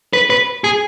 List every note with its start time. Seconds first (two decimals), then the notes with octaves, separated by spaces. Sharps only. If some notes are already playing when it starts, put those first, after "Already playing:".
0.13 B4
0.30 B4
0.64 G#4